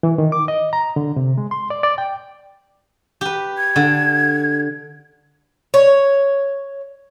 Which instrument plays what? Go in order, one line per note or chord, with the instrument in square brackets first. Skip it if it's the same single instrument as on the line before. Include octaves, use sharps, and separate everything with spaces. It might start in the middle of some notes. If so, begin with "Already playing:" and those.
[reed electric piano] E3
D#3
D6
D#5
A#5
D3
C3
G#3
C6
D5
D5
G5
[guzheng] G4 B4
[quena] G#6
[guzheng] D3
[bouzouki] C#5